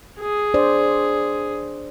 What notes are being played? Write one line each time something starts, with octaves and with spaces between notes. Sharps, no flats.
G#4
D4 C5 D5